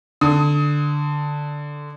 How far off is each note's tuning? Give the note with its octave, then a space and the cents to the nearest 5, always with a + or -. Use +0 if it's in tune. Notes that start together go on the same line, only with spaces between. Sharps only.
D3 +0 D#6 +25